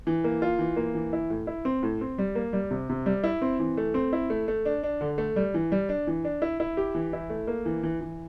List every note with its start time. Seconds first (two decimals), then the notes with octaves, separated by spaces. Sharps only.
0.07 E3
0.24 A#3
0.42 F4
0.59 E3
0.76 A#3
0.95 E3
1.13 E4
1.30 A2
1.47 E4
1.65 C4
1.83 A2
2.01 C4
2.18 G3
2.35 A#3
2.53 G3
2.71 C3
2.89 C3
3.06 G3
3.24 E4
3.42 C4
3.60 E3
3.77 A3
3.94 C4
4.13 E4
4.30 A3
4.48 A3
4.65 D4
4.83 D4
5.01 D3
5.18 A3
5.36 G3
5.54 E3
5.72 G3
5.89 D4
6.07 E3
6.25 D4
6.42 E4
6.60 E4
6.77 G4
6.95 E3
7.13 E4
7.30 A3
7.47 A#3
7.66 E3
7.83 E3
8.01 E3